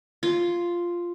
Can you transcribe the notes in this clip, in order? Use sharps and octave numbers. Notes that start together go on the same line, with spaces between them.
F4